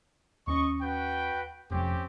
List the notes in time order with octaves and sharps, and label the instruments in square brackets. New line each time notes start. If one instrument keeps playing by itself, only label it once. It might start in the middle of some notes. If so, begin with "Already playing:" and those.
[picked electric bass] D#2 C#4 [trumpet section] D#5 C#6
[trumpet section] F#4 B4 G5
[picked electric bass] F1 F2 [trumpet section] C4 C#4 G4